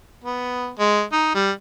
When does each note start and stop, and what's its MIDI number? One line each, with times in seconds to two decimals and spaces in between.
0.24 0.69 59
0.79 1.02 56
1.12 1.32 63
1.35 1.51 55